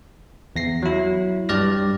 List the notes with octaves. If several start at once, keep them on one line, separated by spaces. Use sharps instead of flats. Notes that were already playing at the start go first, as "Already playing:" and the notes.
E2 A#6 C7
F#3 E4
G2 G3 D5 F6 A#6